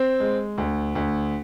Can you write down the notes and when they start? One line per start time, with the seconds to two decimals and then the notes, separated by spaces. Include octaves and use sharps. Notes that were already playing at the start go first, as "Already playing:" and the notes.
Already playing: C4
0.20 G#3
0.58 D2
0.95 D2